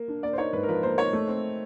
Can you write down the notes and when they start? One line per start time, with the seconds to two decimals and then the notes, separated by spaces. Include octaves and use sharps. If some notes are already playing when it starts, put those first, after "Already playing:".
Already playing: A#3
0.08 D4
0.23 A#3 D5
0.33 C5
0.38 D#4 C#5
0.53 G#2 B4
0.63 A#4
0.68 F3 B4
0.83 A#3 C5
0.98 D#4 C#5
1.13 A3
1.28 C4